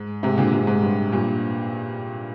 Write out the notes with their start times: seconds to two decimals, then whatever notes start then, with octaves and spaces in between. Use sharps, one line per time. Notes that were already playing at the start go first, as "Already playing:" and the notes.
Already playing: G#2
0.23 G#2 C3
0.37 A#2 D3
0.53 G#2 C3
0.67 G#2
0.82 G2
1.12 G2 A#2